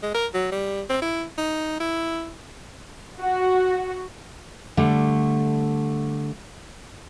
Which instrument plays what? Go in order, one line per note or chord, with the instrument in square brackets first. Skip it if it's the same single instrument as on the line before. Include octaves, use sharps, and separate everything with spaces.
[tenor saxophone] G#3
A#4
F#3
G3
C4
E4
D#4
E4
[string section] F#4
[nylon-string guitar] D3 G3 A3